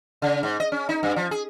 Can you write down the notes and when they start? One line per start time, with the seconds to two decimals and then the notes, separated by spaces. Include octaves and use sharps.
0.22 C#3
0.43 G#2
0.60 D#5
0.72 C#4
0.89 D#4
1.03 G2
1.16 F3
1.31 G#4